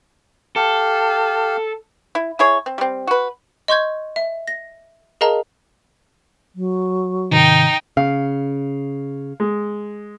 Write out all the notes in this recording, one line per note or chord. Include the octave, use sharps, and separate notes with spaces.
G4 A4 F5
E4
E4 G#4 C#5
C4
G3 C4
F#4 B4
D#5 C6 C#6 G6 G#6
E5
A#6
G#4 A#4 D#5 F5 A5 A#5
F#3
G#2 C3 D#3 D#4 G5
C#3 F5
G#3